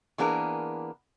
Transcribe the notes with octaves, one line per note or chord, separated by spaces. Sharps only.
E3 A#3 B3 D4 G#4 A#4